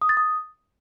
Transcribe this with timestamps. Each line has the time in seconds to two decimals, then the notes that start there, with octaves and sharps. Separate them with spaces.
0.02 D#6
0.09 A6
0.17 D#6